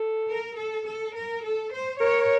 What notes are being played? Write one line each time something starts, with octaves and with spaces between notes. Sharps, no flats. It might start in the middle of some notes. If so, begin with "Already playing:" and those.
Already playing: A4
A#4
A4
A4
A#4
A4
C5
A#4 C#5